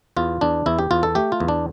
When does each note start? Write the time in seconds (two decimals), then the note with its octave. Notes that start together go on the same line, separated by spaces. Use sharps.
0.17 E2 F4
0.41 E2 D4
0.66 E2 E4
0.79 G4
0.91 E2 F4
1.03 A4
1.15 A3 G4
1.32 F4
1.40 E2
1.48 D4